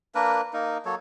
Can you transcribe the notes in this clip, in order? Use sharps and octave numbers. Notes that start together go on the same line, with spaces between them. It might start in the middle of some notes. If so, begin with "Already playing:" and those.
A#3 D4 A#4 B4
A#3 D#4 A#4
F#3 A#3 A4 C#5